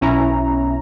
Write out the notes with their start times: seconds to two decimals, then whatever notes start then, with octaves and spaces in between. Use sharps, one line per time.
0.01 B1 C#4 E4 A#5